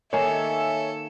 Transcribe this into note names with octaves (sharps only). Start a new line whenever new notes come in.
D#3 A#3 G4 A4 C#5 E5 G#5